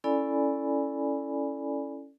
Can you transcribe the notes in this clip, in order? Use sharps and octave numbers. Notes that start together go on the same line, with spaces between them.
C#4 E4 A4 D5 G#5 B5